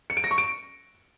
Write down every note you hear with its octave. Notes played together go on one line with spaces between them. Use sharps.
C#7
D7
A#6
C#6
D7